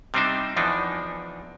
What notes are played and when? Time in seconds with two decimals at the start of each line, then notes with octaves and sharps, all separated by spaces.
0.14 C3 G3 C4 D4 D#4 C5
0.56 E2 E3 F3 D4 D#4